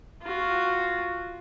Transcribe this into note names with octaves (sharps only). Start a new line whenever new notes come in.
F4 F#4